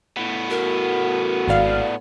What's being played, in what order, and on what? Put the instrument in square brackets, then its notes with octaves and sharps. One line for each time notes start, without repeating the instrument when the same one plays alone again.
[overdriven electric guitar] A2 B3
[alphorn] F#4 [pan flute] A#4
[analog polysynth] G#1 F5 [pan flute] D5